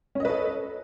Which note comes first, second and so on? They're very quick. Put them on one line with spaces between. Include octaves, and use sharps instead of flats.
C#4 D#5 B4 A4